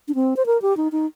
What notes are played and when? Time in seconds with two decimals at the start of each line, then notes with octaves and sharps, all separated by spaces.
0.08 D4
0.15 C4
0.37 C5
0.46 A#4
0.62 G4
0.77 D#4
0.92 D#4